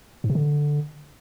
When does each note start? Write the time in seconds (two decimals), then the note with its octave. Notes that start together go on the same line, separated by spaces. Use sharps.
0.24 G#2
0.30 C3
0.35 D3